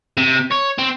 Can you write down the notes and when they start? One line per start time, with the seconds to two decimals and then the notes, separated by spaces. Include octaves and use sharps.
0.18 C3
0.52 C#5
0.79 C4